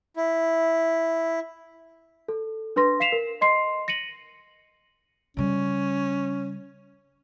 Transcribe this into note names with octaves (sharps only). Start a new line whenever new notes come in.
E4
A4
D4 B4 C6 A#6
F5 B6 C7 E7 F7
A#4
D#5 C6 C7
A#6 C#7 D#7 F#7
C#3 G3 C#4